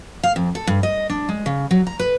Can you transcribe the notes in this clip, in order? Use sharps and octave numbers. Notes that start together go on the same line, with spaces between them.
F5
F2
A4
G2
D#5
D4
G#3
C#3
F#3
A#5
B4